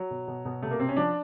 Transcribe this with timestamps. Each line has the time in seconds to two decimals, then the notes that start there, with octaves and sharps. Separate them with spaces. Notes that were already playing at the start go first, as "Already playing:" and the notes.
Already playing: F#3
0.10 B2
0.27 B2
0.45 B2
0.62 C3 A3
0.71 A#3
0.80 C3 C4
0.88 C#4
0.96 F3 D4